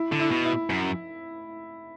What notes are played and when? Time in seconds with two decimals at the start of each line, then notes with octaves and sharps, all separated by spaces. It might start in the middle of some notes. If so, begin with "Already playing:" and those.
Already playing: E4
0.12 D3
0.19 E4
0.31 B2
0.45 E4
0.70 F#2